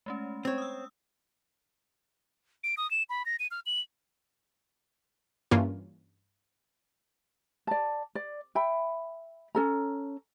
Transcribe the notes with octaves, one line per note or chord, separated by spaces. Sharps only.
G#3 A3 C#4
C4 C#5
D#6 E6
D7
D#6
E7
B5
A#6
D#7
F6
F#7
G2 E3 A#3 C#4 F4
D5 A5
D5
E5 G5 B5
C#4 A4 A#5